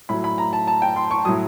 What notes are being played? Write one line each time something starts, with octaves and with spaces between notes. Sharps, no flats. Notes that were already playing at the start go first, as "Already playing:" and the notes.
A2 F#3 B5
B5
A#5
A5
A5
G5
C6
C#6
A2 F#3 D#6